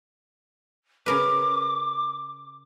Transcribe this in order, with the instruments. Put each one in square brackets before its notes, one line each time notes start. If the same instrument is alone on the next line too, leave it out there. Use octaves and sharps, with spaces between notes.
[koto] C#3 A#4 B4 [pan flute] D6